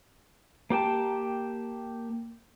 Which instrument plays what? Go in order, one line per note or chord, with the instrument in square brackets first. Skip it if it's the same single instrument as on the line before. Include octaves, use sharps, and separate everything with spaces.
[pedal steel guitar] A#3 G4 G5 A5